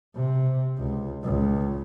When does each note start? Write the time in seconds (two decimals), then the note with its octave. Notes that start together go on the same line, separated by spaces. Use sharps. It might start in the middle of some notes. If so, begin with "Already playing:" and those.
0.15 C3
0.78 C#2
1.24 C#2